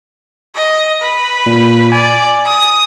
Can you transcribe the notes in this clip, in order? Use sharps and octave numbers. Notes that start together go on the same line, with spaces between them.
D#5
B4
A#2
D5 G#5
D#6